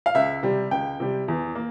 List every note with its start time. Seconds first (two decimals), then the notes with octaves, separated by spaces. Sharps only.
0.06 F5
0.15 C#2 E5
0.43 C3 G3
0.71 C#2 G5
1.00 C3 G3
1.28 E2
1.55 A#3